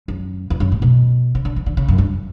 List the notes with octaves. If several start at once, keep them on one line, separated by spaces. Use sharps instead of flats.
F#2
E2
F#2
A2
B2
C#3
D3
E3
D3
C#3
F#2
G2